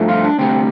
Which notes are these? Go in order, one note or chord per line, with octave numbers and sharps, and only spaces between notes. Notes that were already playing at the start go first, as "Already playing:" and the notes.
Already playing: G2 F3 A3
F4
D4
D2 C3 G3 C4